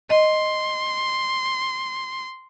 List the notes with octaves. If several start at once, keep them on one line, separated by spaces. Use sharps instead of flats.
D#5 C6